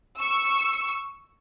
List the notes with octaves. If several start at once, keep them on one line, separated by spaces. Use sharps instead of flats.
C#6 E6